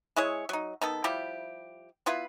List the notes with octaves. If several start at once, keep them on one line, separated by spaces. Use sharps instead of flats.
G#3 E4 G#4 C#5
F#3 D#4
D#3 B3 A4
F3 G3 E4 G4
B3 E4 F4 B4